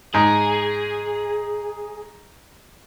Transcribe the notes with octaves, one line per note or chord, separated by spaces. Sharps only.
G#2 G#4